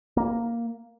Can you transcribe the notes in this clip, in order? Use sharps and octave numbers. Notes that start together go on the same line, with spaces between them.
A#3